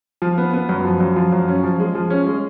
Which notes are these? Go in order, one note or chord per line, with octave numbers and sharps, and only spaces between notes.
F3
B3
B3
F#2
F3
F#2
F3
F#2
C#4
F3
G#3
F3
C#4
G#3